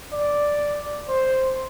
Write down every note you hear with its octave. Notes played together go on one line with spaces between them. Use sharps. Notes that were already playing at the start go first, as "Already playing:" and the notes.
D5
C5